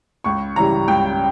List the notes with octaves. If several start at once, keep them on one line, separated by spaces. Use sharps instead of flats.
C#2 C#6
C#3 E3 G3 A#5
C#2 G5